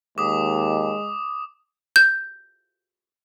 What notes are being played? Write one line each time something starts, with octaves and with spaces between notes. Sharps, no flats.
D#2 G#3 D6 D#6
G6